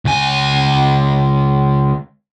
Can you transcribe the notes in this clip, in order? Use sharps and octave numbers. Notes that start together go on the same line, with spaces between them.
C#2 G#5